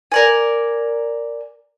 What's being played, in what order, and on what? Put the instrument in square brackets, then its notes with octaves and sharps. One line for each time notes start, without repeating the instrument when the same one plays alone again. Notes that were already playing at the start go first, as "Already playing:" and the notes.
[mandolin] A#4 D5 G#5